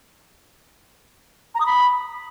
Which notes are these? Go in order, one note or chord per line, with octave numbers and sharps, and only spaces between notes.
A#5
D#6
B5